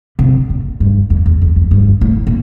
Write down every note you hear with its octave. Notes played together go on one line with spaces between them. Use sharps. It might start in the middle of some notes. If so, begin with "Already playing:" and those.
C3
A#2
G2
F2
E2
F2
F2
G2
A2
A#2